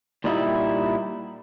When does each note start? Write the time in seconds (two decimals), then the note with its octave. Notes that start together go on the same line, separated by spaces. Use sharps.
0.24 A#2 G3 D#4 E4